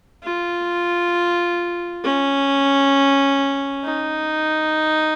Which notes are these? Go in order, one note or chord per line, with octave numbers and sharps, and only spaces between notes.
F4
C#4
D#4